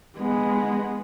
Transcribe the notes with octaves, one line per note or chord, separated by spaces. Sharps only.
G#3 B3